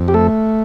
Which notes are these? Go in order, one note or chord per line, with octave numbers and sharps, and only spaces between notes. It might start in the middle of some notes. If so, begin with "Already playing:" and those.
Already playing: F2
G4
A3 A4